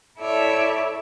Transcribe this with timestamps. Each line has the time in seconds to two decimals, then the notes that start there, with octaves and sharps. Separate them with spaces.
0.18 E4 A4 C#5 D5 E5